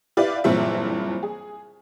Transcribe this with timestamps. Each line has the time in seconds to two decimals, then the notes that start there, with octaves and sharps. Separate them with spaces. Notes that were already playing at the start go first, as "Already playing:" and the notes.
0.17 E4 G4 B4 D5 F5
0.44 F#1 G2 A#2 E3 C4 E5
1.23 G#4